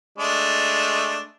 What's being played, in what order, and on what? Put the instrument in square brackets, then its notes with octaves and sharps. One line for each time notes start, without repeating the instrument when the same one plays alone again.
[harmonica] G#3 A3 D4